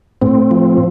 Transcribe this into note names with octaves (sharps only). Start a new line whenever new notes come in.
A2 C4
F3